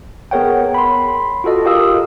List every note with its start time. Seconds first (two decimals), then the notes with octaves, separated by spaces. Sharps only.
0.31 B3 G#4 A#4 C#5 F#5 G5
0.74 B5 C6
1.44 F4 F#4 A4 D#5
1.64 F4 G4 A#4 F5 D#6 E6